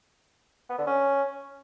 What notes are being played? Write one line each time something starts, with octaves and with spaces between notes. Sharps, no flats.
B3
D3
C#4